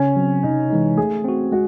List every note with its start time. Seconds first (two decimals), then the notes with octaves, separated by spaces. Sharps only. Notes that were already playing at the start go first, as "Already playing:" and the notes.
Already playing: C#3 C#4
0.16 F#3 C4
0.43 C3 D#4
0.70 E3 G#3 D#4
0.97 A3 G#4
1.24 C4 F#4
1.52 G#3 F#4